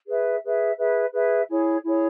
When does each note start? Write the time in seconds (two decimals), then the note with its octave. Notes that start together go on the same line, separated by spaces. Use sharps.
0.08 G#4 B4 E5
0.42 G#4 B4 E5
0.78 G#4 B4 E5
1.13 G#4 B4 E5
1.48 E4 G#4 C#5
1.83 E4 G#4 C#5